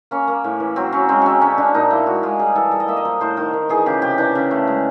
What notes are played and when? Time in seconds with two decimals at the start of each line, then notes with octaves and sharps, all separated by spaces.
0.11 A#3 C#4
0.28 A#3
0.44 A2
0.60 E3
0.76 F#3 C4
0.93 F#3 C#4
1.08 G#3 C4
1.22 G#3 C4 C#4
1.41 D3 C#4
1.58 D3 D4
1.74 A#2 D#4
1.90 A#3 E4
2.06 G#3 F#4
2.23 G#3 F4
2.39 G3 G#4
2.55 E3 A4
2.72 G3 A4
2.80 D#5
2.88 A#3 E5
2.97 D#5
3.05 F3
3.21 A2 C5
3.37 D#3 A#4
3.53 D#3
3.69 E3 G#4
3.86 C#3 G4
4.02 C3 G4
4.18 E3 D4
4.35 C#3
4.51 A3
4.67 G#3